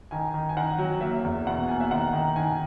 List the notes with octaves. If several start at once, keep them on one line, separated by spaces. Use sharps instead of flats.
D#3 G#5
D#3
G#5
D#3 F#5
F#3
A#3 E5
E2
B2 F#5
A#3 G#5
E5
D#3 F#5
D#3
D#3 G#5